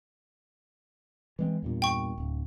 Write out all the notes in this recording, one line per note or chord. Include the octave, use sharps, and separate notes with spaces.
E3 G#3 C4
E2 G2 A#2
G5 C#6
D1